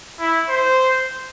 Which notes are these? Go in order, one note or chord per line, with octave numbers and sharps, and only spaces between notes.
E4
C5